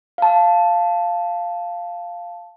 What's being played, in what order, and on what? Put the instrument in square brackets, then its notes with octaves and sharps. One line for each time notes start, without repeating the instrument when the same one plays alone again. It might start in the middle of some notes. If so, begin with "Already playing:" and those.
[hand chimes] F5 A5